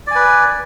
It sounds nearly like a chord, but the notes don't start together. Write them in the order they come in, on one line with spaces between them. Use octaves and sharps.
D5 G#5 B4